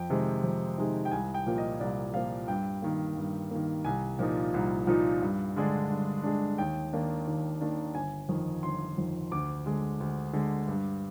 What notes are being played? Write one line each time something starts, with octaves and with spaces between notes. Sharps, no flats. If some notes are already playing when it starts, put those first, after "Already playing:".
Already playing: F2 G5
C3 D#3 G#3 D#4
F2
C3 D#3 G#3 D#4
G5
C2 G#5
G5
A#2 F3 A#3
D#5
C2 D5
A#2 F3 A#3 F5
G2 G5
D#3 A#3
G2
D#3 A#3
C2 G#5
A#2 F3 A#3 D#4
C2
A#2 F3 A#3 D#4
G2
D3 G#3 D4
G2
D3 G#3 D4
D#2 G5
D#3 A#3 D4
D#2
D#3 A#3 D4
G1 G#5
F2 D#3
G1 C6
F2 D#3
D2 D6
D3 G#3
D2
D3 G#3
G2